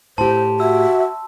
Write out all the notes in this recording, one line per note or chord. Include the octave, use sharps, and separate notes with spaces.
A2 G4 C5 A5 C6
F#4 E5 E6